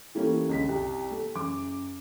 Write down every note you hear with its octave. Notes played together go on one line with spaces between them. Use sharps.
E3 G3 A3 A#3 C#4
C#2 D3 B6
C2 C3 G4
A3
F#1 D6